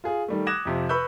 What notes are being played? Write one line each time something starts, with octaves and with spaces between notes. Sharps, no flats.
F4 G#4
D#3 G3 A3
D6 D#6 F#6 G#6 A#6 E7
F2 C3 F3
B4 B5 C#6 E6 G6